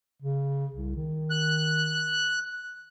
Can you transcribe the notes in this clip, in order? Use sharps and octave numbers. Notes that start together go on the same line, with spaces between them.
C#3
C2
D#3
F#6